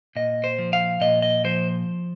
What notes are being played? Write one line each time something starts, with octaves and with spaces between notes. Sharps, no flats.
A#2 D#5
C5
F3
F5
A#2 D#5
D#5
F3 C5